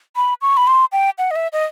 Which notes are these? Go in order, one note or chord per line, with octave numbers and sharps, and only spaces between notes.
B5
C#6
B5
C6
G5
F#5
D#5
E5
D#5